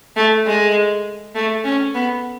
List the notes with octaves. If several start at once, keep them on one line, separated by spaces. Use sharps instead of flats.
A3
G#3
A3
C#4
B3